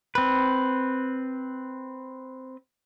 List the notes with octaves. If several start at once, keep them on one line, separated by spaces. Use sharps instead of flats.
C4 B4